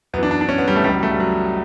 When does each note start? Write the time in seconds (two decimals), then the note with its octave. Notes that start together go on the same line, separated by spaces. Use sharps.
0.13 F#2 B3
0.18 E3 D4
0.31 D4
0.41 D4
0.49 C#4
0.58 B3
0.68 G3
0.76 A3
0.84 C#2 C#3 E3 G3
0.93 F#3
1.03 A3
1.11 G3
1.20 F#3